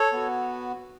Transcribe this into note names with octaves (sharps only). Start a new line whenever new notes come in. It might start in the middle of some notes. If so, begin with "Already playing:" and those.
Already playing: A4 C#5
B3 F#4